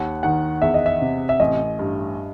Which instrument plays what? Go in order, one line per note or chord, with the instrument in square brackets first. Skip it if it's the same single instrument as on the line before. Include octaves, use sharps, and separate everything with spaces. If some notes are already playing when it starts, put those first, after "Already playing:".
Already playing: [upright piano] D#2 [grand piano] F#5
[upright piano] D#3 [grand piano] F#5
[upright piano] E2 [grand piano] E5
[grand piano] D#5
E5
[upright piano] C3
[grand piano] E5
[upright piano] A1 [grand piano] D#5
[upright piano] G2